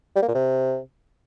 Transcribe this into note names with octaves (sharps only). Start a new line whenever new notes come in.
G3
A#3
A#2
C3